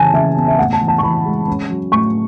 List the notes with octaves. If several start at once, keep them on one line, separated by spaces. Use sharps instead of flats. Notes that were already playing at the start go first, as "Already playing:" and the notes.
Already playing: C#3 E3 C#4 G#5 A5
C#3 E5
B3
E5
A2 F#5
A5
E3
A5
C#6
E3 B5
G#3
C#4
F#3
A2 C#6